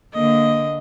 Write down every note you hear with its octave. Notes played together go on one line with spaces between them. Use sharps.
D3 A#3 D#5